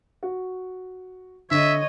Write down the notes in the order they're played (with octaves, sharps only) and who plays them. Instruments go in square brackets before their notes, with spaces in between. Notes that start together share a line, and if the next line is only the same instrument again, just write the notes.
[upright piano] F#4
[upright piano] D3 [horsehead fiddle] C#5 D#5 [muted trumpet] E5